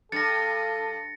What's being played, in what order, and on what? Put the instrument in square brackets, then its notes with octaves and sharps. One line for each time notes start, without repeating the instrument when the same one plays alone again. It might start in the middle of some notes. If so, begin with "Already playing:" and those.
[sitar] G2 [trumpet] A4 [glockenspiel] A6 A#6 [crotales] C#7